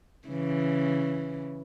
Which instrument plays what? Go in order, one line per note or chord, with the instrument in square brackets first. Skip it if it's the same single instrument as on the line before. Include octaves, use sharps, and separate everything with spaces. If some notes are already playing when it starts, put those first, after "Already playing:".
[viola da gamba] C#3 E3